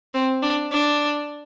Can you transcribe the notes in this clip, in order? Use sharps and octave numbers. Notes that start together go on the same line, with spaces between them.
C4
D4
D4